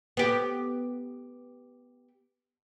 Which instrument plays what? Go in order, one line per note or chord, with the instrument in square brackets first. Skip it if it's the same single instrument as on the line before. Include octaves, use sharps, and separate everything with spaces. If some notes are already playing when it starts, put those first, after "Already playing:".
[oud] B3 G4